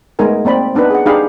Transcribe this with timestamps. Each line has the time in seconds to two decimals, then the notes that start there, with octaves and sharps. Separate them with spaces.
0.19 G#3 A3 B3 D#4 A#4 G#5
0.45 A#3 C4 D5 B5
0.75 B3 D4 D#4 B4
0.90 G#4 F#5
1.06 D4 D#4 G4 G#4 F5 B5